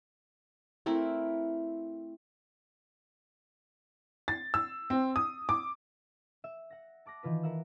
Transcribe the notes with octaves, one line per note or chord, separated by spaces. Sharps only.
A3 C4 E4 A#4
A6
E6
C4
D#6
D6
E5
F#5 A#6
A5 D6 F#6 A#6
D#3 E3 F4 B4
A#4 E5 F#5 E6